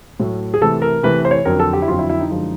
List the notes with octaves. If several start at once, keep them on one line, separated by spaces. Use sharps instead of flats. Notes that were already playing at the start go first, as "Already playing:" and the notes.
A2 F#3 A3
G#4
C3 E3 A3 A4
A#4
C3 E3 A3 B4
C5
C#5
F2 D3 F#3 A#4
A4
G4
E4
F2 D3 F#3 F4
E4
E4
D#4
F#2 D3 F3 G#3